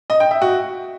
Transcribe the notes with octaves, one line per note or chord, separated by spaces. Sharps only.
D#5
G5
E5
F#4